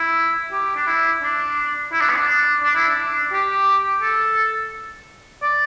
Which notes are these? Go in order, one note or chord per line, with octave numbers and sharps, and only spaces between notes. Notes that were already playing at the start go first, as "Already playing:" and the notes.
Already playing: E4
G4
D4
E4
D4
E4
D4
B3
D4
D4
E4
D4
G4
A4
D5